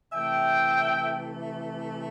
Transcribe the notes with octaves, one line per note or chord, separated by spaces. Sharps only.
C3 E3 A3 E5 G5